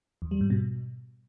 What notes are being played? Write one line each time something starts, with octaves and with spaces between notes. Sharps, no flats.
E2
G3
G#2
B2